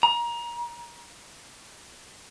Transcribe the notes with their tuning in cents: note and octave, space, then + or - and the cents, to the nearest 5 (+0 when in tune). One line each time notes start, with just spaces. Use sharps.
A#5 +25